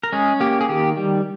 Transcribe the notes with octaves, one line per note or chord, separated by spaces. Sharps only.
A#4
G#3 C#4 G#4
A#3 G4
G#4
D#3 G4
G3